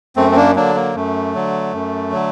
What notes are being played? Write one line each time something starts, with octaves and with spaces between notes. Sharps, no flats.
F#2 A3 C4
C4
A#3 D4
D3 F#3 A#3 D4
A#3
F#2 A3
D3 F#3
F#2
D3 F#3